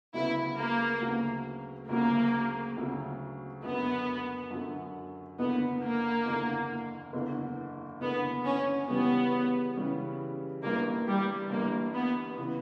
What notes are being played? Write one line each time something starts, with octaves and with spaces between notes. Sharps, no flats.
D2 C#3 F#3 B3 E4
A#3
D2 C#3 F#3 B3
D2 C#3 F#3 A#3
D2 C#3 F#3
F#2 D3 F#3 B3
F#2 D3 F#3
F#1 E2 D3 B3
A#3
F#1 E2 D3
F#1 E2 D3
F#1 E2 D3 B3
C#4
C#3 E3 G3 B3 C#4 G4
C#3 E3 G3 C#4 G4
G1 G2 E3 A#3
G3
G1 G2 E3 A#3
B3
C#3 E3 B3